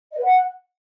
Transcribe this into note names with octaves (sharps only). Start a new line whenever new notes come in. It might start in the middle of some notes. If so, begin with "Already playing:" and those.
D#5
B4
F#5